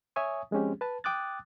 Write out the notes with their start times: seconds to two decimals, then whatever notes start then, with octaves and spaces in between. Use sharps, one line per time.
0.16 C#5 E5 G#5 C#6 D#6
0.51 F3 G#3 C4 C#4 G4
0.81 B4 A5
1.04 G5 D6 D#6 F#6 A6